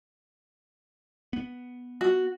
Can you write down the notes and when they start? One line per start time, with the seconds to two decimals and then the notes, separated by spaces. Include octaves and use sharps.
1.33 B3
2.01 F#4